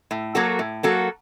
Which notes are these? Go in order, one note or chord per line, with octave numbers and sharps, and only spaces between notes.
A2
F#3 A#3 F#4 A4
A2
F#3 A#3 F#4 A4